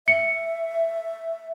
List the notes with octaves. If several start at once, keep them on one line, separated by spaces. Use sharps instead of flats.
E5 C#7